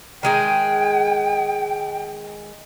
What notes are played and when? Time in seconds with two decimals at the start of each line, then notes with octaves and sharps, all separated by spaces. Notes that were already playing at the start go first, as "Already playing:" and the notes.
0.23 D#3 G#3 G#4 G5